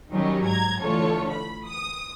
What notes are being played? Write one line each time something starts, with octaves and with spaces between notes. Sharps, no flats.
D#3 F#3 G3 C#4 D#4
G#2 A#5 G#6
D3 E3 A3 F4 A4 C#5
B5
D#6